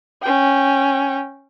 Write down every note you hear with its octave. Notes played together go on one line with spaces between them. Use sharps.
C#4 G5